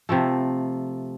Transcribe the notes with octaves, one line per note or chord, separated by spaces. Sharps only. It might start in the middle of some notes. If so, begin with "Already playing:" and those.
C3 F3 A3